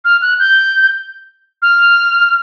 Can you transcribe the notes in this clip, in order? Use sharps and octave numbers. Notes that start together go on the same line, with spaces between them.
F6
F#6
G6
F6